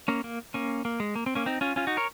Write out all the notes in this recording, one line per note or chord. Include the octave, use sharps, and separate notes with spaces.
A#3 C#4
A#3
A#3 C#4
A#3
G#3
A#3
C4
A#3 C#4
C4 D#4
C#4 F4
C#4 F4
D#4 F#4
A#4 C#5